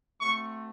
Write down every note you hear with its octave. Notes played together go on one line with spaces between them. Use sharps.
A3 C4 F#4 C#6